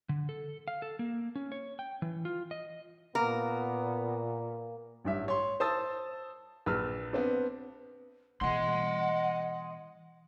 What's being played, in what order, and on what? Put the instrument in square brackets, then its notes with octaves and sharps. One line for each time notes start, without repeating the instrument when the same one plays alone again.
[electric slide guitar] D3
A4
F5
A4
A#3
C#4
C#5
G5
E3
F4
D#5
[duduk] A#2 [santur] A#3 [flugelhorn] B3 [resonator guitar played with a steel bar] A#4
[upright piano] A1 G2 E5
C#5 C6
C5 A5 D#6 E6 A6
A#1 B4 E6 F6
B3 C4 D4
[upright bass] B2 E3 [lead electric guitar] D#5 C6 [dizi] F#5